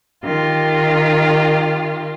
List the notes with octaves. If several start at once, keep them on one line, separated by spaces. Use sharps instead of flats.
D#3 F4 G4